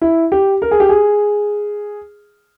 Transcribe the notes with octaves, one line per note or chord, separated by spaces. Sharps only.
E4
G4
A#4
G#4
G4
G#4